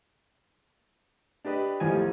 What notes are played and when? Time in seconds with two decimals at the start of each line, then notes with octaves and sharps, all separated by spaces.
1.45 D4 G4 B4 D#5
1.80 A1 E2 F3 G3 D#5 G#5